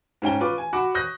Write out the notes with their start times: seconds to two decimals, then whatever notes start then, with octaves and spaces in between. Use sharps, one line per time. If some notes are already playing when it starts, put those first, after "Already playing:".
0.22 G#2 C#4 G5 G7
0.40 F4 B4 C#6 D6
0.58 G#5
0.73 F#4 F#5 B5 D6
0.94 C#6 D#6 F#6 G6 A#6